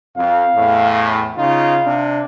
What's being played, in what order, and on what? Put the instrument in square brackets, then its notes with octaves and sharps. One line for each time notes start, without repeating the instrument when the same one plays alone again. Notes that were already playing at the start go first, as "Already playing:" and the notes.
[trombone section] F2 [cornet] F5
[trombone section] E2 A2
[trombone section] C#3 D#4 F4 [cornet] F5
[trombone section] C3 D4